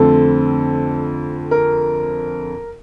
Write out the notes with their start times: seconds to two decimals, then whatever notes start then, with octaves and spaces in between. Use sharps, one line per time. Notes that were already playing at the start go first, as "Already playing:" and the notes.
Already playing: F2 D3 A3 C4 A4
1.51 A#4